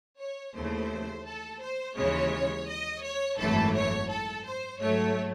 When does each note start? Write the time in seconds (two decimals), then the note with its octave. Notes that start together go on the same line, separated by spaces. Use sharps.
0.20 C#5
0.55 D#2 C#3 E3 A3 C5
1.26 A4
1.61 C5
1.97 D#2 C#3 E3 G#3 C#5
2.67 D#5
3.03 C#5
3.38 G#1 F#2 E3 A3 A4
3.74 C#5
4.10 A4
4.45 C5
4.80 G#2 F#3 A3 C#5